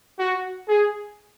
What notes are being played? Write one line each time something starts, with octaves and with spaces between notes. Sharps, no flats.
F#4
G#4